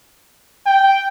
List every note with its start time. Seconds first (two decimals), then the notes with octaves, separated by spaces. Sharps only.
0.66 G5